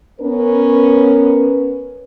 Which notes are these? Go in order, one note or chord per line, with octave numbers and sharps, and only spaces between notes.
B3 C#4 A#4 B4